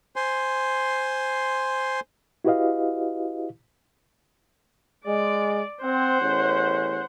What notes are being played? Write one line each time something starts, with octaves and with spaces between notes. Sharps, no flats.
C5 G#5 C6
E4 F#4 G4 B4 D#5 F5
G#3 D5
C4 C5 F#5
A1 E2 C#4